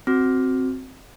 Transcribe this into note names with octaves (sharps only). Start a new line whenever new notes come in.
C4 F#4